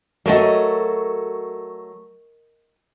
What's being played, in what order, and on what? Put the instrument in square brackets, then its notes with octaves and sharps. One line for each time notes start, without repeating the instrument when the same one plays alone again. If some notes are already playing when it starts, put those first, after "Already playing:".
[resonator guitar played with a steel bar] F#3 A3 F#4 [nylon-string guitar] A#4 D#5